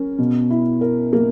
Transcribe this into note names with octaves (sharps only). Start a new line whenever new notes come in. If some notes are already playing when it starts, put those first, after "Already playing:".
Already playing: C#4 A#4
B2
E4
A#4
A#3